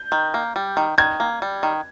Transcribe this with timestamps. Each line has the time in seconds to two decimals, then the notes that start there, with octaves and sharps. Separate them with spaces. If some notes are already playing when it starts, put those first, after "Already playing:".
Already playing: G6
0.12 D#3
0.34 A#3
0.56 G3
0.77 D#3
0.98 D#3 G#6
1.20 A#3
1.42 G3
1.63 D#3